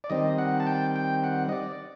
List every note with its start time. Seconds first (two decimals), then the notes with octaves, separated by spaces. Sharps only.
0.04 D5
0.10 D#3 G3 C4 D#5
0.38 F#5
0.60 A5
0.67 G5
0.96 G5
1.24 F#5
1.49 D#5
1.52 D5